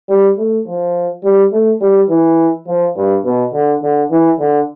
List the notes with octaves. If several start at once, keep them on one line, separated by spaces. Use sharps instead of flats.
G3
A3
F3
G3
A3
G3
E3
F3
G2
B2
D3
D3
E3
D3